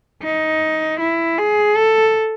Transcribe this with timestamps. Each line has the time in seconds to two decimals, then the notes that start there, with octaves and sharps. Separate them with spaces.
0.23 D#4
1.00 E4
1.38 G#4
1.77 A4